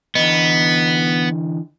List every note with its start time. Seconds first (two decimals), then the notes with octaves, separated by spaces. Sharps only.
0.15 D3 E3 B3 D#5